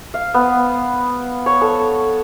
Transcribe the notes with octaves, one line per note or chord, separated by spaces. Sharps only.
F5
B3
C#5
A4